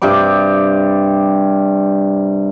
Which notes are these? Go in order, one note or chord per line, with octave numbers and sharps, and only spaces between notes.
G2 C3 G4 D6